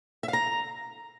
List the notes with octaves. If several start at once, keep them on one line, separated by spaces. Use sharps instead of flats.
E5
F5
A#5